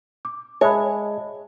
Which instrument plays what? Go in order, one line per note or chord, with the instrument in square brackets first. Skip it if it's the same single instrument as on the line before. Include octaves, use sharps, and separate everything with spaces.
[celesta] D6
[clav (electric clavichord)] G#3 [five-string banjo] C#5 [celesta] E5 A5 B5